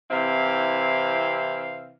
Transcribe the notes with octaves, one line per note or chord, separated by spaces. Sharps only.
C3 E3 C4 E4 F5